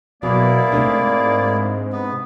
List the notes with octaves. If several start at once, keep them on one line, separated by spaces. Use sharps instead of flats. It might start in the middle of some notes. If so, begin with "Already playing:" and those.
B2 F#3 A#3 E4 G#4 D5
G#2 C3 A3 D4
B3